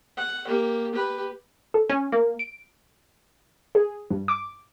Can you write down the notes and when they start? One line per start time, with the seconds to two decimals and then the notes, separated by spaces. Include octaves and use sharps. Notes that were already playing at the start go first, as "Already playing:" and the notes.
0.17 F#5
0.47 A#3 G4
0.93 G4 B4
1.74 A4
1.90 C#4
2.12 A#3
2.39 D7
3.75 G#4
4.10 G2
4.28 D6